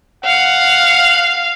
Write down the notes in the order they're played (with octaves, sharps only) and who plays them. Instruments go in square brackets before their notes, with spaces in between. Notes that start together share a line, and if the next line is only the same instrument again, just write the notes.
[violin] F5 [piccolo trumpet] F#5